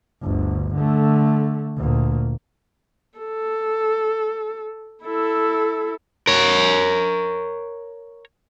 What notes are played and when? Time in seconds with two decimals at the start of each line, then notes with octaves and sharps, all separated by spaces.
0.22 G1 D2
0.75 D3 A3
1.77 D2 A#2
3.19 A4
5.05 E4 A4
6.27 A#4 C#5